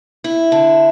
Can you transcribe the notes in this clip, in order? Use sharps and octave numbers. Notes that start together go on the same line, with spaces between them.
E4
D3